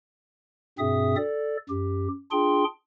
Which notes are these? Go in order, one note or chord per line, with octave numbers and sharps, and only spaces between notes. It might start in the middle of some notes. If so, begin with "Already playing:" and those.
G2 B2 C4 G#4 E5 D#6
A4 D5
F#2 G4
D4 F4 G#4 G5 C6